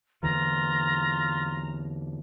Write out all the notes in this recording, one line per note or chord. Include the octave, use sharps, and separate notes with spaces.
E2 D3 E3 F4 A#5